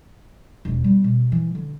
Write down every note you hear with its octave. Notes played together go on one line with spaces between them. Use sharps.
E1 D#2
G3 B3
B2
E3
D3